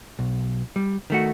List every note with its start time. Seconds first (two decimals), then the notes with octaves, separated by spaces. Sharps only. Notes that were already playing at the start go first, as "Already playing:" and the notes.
0.19 B1
0.76 G3
1.10 D#3 A3 F#4